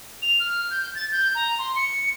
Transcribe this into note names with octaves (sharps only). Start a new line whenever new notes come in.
F7
F6
G6
A6
G6
A#5
C6
C#7